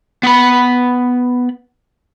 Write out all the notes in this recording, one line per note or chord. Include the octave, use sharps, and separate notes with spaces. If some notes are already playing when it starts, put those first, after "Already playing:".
B3 B5